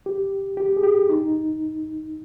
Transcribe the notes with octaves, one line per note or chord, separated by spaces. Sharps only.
G4
G4
G#4
G4
D#4